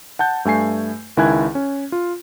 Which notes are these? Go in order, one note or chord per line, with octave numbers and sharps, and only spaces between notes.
F#5 A5 G6
G2 A3 G#5 C7
C#2 D#3 E4 G#5 F#6 G#6
C#4
F4